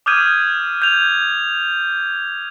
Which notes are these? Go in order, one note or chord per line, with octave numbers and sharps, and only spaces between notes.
D6 D#6 F6 G6 G#6 D#7
G6 F7